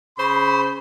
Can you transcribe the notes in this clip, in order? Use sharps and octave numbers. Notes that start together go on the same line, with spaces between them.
C#3 C5 B5